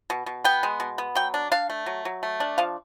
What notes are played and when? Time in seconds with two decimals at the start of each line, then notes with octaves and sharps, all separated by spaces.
0.10 B2
0.26 B2
0.44 B3 G5
0.63 G#3
0.80 B2
0.98 B3
1.15 F#3 G5
1.34 D4
1.52 D4 F5
1.70 A3
1.86 F#3
2.05 F#3
2.23 A3
2.40 D4
2.58 F3 F5